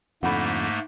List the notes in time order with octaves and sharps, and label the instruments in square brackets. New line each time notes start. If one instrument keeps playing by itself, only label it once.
[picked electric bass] F2 D3 [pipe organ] G#2 A3 A#3 [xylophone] F#5 B5